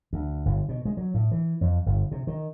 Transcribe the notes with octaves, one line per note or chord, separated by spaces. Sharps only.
D2
G1
B2
G#3
F#3
A2
E3
F2
G1
C3
D#3